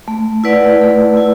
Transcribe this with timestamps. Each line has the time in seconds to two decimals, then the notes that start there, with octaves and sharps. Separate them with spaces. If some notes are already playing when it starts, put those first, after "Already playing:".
0.08 A3
0.44 E4 B4 D5 F#5
0.81 A3
1.17 E4